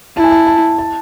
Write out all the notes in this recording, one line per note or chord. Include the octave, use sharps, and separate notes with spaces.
E4 A5
G#5
A5
A5
A5